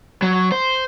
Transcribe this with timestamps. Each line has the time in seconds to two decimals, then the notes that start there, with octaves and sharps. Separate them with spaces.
0.22 F#3
0.52 C5